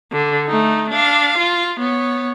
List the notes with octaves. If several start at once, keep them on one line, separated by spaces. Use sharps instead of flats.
D3
A3 D#4
D4 F5
F4
B3 C#5